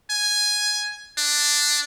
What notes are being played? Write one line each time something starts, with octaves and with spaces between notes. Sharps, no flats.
G#5
D4